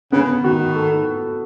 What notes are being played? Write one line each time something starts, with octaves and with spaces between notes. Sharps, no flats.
C#3 B3
D#3 F#4
A4